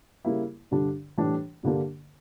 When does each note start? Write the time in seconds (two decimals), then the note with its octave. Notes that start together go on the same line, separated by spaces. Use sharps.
0.25 C#3 G3 A#3 E4
0.71 G2 D3 G3 D4
1.18 A2 E3 G3 D4
1.63 G2 D3 G3 A#3 D4